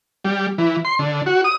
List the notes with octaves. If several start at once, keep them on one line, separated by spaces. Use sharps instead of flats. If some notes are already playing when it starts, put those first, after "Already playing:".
G3
E3
C6
D3
F#4
D#6